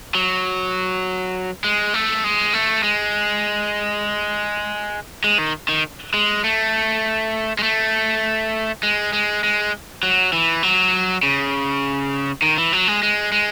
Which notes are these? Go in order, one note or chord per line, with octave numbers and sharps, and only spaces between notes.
F#3
G#3
A3
G#3
A3
G#3
G#3
D#3
D#3
G#3
A3
G#3
A3
G#3
G#3
G#3
F#3
E3
F#3
C#3
D#3
E3
F#3
G#3
G#3
G#3